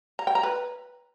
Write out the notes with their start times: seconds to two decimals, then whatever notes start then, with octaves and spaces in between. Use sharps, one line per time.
0.19 A#5
0.27 G5
0.35 A#5
0.43 B4